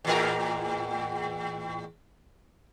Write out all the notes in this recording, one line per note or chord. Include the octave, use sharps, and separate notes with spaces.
E2 A2 A#4